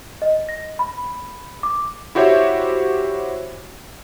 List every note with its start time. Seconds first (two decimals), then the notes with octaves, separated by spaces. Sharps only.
0.22 D#5
0.49 A#6
0.79 B5
1.63 D6
2.15 E4 F#4 G4 C5 C#5 E5